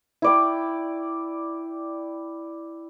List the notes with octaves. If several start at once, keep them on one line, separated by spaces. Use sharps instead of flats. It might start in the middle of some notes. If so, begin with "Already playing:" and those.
E4 D5 G5